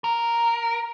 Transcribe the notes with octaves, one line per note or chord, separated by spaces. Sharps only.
A#4